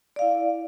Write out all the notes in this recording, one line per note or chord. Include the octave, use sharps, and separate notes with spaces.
E4 D5 F5